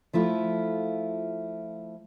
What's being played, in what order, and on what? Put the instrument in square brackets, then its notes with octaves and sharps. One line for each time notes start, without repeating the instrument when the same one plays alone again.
[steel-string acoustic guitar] F3 A3 E4 F4